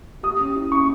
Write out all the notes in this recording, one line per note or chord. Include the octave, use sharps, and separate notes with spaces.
G4 D#6
C#4
E4
C#4 C#6